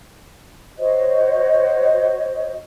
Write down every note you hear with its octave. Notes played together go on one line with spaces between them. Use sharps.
F#4 C5 C#5 D#5